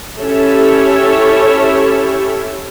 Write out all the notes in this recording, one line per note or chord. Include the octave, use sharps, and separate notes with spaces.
C#4 E4 G4 A4 C#5 E5